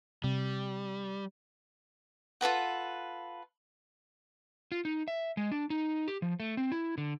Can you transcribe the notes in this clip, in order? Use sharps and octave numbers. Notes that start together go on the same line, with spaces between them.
C3 G3
F4 A4 B4 F#5
F4
D#4
E5
G#3
D4
D#4
G4
F3
A3
C4
E4
D3